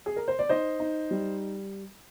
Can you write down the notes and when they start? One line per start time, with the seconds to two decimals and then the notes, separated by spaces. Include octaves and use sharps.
0.06 G#4
0.16 A#4
0.28 C5
0.39 D5
0.49 D#4 C5 D#5
0.80 D#4
1.11 G3